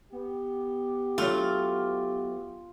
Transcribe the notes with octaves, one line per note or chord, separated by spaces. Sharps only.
B3 G4
F#3 A3 F4